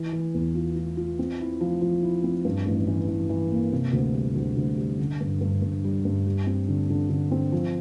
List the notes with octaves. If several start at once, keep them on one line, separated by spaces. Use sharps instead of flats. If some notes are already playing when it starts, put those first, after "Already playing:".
Already playing: E3
E3
E2
F4
F4
F4
C4
E4
F3
F3
E4
C4
G2
A1
E3
E3
E3
A#3
C3
D2
G3
D2
D2
G3
D3
G2
G2
G2
G3
G2
G3
C4
D3
D3
D3
C4
F3